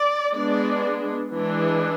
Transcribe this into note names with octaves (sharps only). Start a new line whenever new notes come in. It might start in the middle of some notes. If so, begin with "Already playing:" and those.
Already playing: D5
G#3 B3 D4 D5
E3 G#3 D4